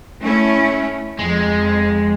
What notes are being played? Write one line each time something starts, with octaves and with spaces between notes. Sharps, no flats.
A3 C#4 E4
F2 G#3